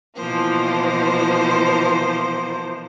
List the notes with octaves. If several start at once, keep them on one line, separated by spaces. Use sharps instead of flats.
B2 E3 F3 A#3 C5